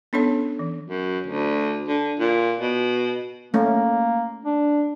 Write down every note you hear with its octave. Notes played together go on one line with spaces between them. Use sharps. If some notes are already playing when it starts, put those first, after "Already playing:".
B3 C#4 D4 A4 C#5 A5
E3
F#2
D2
D3
A#2
B2
A3 A#3 C#4
D4